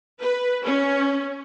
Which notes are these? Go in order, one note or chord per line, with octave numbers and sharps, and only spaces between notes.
B4
C#4